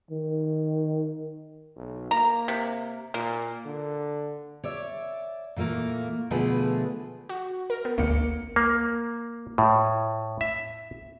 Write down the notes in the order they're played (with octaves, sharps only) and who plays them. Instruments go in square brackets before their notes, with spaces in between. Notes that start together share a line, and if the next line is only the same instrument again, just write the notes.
[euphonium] D#3
[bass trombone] B1
[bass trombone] A#3 [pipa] A#5
[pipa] C3
[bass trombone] A#2 [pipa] A#3
[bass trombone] D3
[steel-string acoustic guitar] C#5 D5 E5
A#2 E3 A3 A#3
B2 D3 F3 A3 G#4 B4
[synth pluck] F#4
A#4
B3
[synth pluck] G#1 D2 [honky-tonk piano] A#3 C#7
[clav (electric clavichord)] A#3
A2
E5